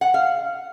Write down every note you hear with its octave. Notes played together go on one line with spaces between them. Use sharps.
F#5
F5